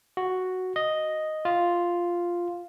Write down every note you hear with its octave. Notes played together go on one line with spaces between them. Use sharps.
F#4
D#5
F4